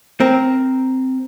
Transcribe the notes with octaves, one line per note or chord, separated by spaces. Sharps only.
C4 A#4